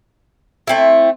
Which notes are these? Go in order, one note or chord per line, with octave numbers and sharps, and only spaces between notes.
A3 C4 E4